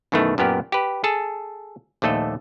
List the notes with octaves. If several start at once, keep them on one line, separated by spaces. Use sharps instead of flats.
F#2 B2 D#3 E3 A3
F#2 A#2 B3 G4 A#4
G4 B4
G#4 A4 A5
A#1 D#2 A3 A4 D#5